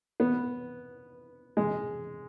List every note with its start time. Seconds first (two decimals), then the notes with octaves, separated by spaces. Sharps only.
0.20 B3
1.57 G#3